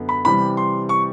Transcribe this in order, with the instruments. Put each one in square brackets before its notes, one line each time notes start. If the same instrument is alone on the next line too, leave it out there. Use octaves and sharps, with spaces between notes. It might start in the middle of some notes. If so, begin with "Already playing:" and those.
Already playing: [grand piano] F#2 D3 B3
B5
C3 E3 G3 B5
C6
C#6